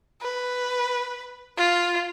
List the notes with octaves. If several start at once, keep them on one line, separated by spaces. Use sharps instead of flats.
B4
F4